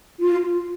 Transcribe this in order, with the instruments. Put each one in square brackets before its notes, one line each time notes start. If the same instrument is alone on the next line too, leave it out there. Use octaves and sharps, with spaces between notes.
[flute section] F4